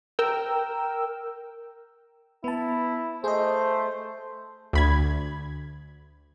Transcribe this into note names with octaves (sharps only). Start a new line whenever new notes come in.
A#4 G5 E6
B3 E4 A5
A3 G#4 C5 D#5
D2 B5 G#6